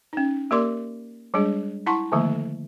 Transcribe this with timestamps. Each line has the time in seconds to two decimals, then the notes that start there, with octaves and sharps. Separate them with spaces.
0.13 C#4 D#4
0.51 A#3 G4 A#4 D5 C6 D6
1.34 G3 G#3 D4 G#4
1.86 E4 F#5 A5 C6 C#6
2.12 D3 D#3 F3 A3 A#3